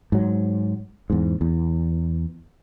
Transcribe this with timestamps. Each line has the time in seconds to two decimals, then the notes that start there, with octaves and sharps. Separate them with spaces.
0.12 G#2 F#3
1.10 E2 G#2
1.41 E2